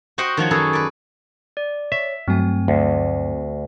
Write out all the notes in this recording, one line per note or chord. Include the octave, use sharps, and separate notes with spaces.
F#4 C5 D#5 F#5 G5
D#3 F3 F#4 C#5
F#2 D#3 G#4 A4 B4
B4 D5
D5
C#5 E5
G2 F#3 A3 C4 G#5
D2